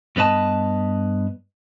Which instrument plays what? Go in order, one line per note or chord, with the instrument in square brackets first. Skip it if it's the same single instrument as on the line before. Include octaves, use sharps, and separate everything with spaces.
[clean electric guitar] G2 B3 B4 D#5 A5